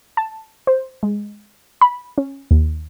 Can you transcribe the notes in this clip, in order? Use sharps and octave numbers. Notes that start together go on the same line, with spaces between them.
A5
C5
G#3
B5
C#4
D#2